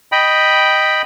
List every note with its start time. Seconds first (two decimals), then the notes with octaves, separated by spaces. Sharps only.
0.12 D#5 G5 B5